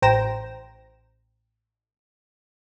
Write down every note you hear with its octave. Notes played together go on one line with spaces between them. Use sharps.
A1 C5 G5 A#5 A#6 E7